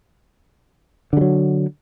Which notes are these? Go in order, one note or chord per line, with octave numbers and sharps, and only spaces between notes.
D3 F#3 G3